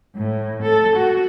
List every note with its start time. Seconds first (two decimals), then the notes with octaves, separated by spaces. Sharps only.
0.15 A2
0.62 A4
0.97 F#4